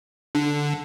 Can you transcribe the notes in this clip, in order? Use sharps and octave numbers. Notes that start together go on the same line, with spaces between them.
D3